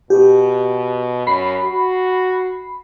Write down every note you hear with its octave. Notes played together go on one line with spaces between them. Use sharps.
B2 G4
F#2 B5 C7
F#4